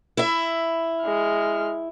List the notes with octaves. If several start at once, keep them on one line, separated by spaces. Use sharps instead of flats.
E4 E5
G#3 F6